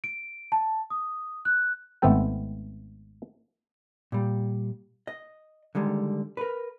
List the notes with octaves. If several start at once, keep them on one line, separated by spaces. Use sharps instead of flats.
D7
A5
D#6
F#6
G#1 A3 B3 C4 A4 G5
A#2 G3
D#5
D3 D#3 G3 G#3
A#4 B4